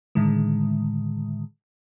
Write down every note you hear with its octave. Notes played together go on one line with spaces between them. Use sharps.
A2 D3 D#3 G#3